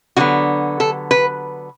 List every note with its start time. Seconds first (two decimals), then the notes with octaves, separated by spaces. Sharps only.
0.17 D3 F#3 B3 F#4
0.80 A4
1.11 B4